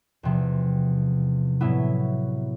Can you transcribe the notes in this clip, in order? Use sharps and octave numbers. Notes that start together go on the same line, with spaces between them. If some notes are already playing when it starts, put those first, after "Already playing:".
E2 C3 F3
A2 F#3 B3 E4